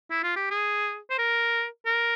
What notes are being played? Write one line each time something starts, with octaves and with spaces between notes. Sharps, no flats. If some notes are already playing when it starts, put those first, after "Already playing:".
E4
F4
G4
G#4
C5
A#4
A#4